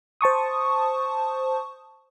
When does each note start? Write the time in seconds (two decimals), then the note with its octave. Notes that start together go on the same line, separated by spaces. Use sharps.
0.21 C5 A5 C#6 D#6